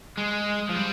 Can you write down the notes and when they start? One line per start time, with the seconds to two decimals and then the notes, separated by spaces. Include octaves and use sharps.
0.17 G#3
0.69 F3
0.75 G3